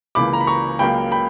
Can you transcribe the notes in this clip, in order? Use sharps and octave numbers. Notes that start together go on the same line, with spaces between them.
C#2 C#3 E3 A#3 B5 D6
A#5
B5
A#5 C#6
C#2 C#3 F#3 A#3 G5 B5
G5 B5